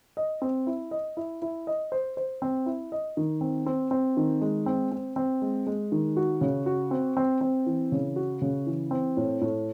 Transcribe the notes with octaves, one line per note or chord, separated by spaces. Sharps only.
D#5
C4
E4
D#5
E4
E4
D#5
C5
C5
C4
E4
D#5
D#3
C4
C4
C4
D#3
G#3
C4
C4
C4
G#3
G#3
D#3
F#4
C#3
F#4
C4
C4
C4
E3
C#3
F#4
C#3
E3
C4
A2
A2